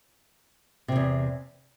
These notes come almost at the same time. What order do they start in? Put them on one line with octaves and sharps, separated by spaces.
C3 G#2 E2